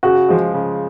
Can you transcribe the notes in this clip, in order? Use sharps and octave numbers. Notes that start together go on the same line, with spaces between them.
C#3 F#4
F3 G#3
C#3